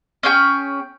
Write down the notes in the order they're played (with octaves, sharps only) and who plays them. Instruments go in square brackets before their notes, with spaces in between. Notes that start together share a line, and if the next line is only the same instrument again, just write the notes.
[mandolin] C#4 G#4 G5